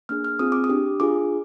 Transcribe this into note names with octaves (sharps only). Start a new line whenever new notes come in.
A#3 D4 G#4 F6
F6
C4 F4 G#4 D#6
D6
D#6
D4 G4
D4 F4 G#4 D6